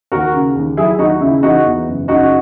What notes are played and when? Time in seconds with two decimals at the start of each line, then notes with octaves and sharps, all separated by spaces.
0.12 D#2 F#4 A#4
0.34 C#3
0.56 D#2
0.77 F#3 E4 G#4
0.99 D#2 D#4 F#4
1.21 C#3 E4
1.43 E3 D#4 F#4
1.65 E2
1.87 F#1
2.08 C#3 D#4 F#4